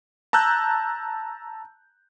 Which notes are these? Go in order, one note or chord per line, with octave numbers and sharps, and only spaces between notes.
A5 A#5 E6 F#6 G6